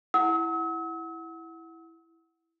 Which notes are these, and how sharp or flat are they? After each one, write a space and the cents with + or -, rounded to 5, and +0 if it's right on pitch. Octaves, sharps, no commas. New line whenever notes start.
E4 +0 F#5 +0 E6 -45